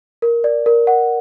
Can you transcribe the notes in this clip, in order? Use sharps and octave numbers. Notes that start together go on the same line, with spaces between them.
A#4
D5
A#4
F#5